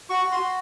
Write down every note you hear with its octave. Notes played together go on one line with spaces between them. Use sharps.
F#4 C#6
F#4
C6
F#4